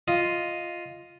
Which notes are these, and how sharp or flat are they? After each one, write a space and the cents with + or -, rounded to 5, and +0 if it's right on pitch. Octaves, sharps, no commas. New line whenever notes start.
F4 +0 D#5 +0